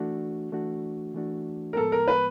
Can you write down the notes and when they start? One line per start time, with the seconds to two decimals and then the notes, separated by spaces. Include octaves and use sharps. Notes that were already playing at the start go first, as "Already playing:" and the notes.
Already playing: E3 A3 D4 F#4
0.52 E3 A3 D4 F#4
1.14 E3 A3 D4 F#4
1.73 A#4
1.77 A2 F3 G#3 B3 A4
1.92 A#4
2.08 B4